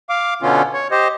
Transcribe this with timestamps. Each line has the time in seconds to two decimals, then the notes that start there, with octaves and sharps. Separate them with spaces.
0.09 F5 D6
0.42 B2 D3 B3 C#4 F4
0.73 C#5
0.91 G4 C5 D#5